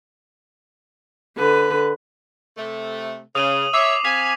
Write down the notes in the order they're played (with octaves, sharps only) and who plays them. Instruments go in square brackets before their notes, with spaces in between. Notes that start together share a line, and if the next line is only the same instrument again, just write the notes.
[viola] D3 B4
[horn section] C3 A3
[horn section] C#3 [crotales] D#6 D#7 F#7
[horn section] C#5 E5 [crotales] D6 C7 F7
[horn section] C4 F5 G#5 [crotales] B6 F7